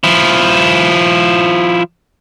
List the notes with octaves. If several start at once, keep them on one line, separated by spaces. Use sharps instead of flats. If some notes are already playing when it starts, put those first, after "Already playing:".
F3 E4